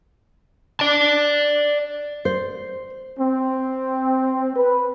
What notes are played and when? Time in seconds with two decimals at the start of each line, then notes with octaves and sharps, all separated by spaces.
0.80 D5 A5
2.25 C5
3.19 C4
4.56 B4